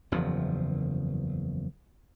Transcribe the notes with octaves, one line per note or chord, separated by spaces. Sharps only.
F#1 E2 C#3 F3